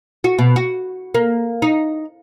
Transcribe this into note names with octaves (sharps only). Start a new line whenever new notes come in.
F#4
B2
F#4
A#3
D#4